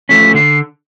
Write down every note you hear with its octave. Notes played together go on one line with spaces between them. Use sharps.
F3 A3 C#4 B6
D3 C7